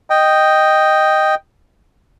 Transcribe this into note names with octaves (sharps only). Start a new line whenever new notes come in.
D#5 G5